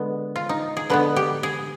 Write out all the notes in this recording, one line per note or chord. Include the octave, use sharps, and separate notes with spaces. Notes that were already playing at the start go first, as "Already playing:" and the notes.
Already playing: D3 G#3 B3
F4
D#4
G#4
D3 G#3 B3 B4
G4
G#4